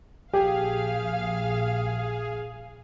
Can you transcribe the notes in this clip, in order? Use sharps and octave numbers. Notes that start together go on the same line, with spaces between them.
A#1 G4 G#4 F5